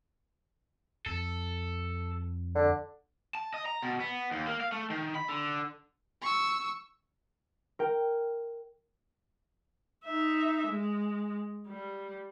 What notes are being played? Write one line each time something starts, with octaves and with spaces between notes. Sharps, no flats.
F2 A4
D3
A5
D#5
A#5
B2
B3
D#2
A#3
F5
A3
D#3
B5
D3
C#6 E6
A#4 G5
D#4 E5
G#3
G3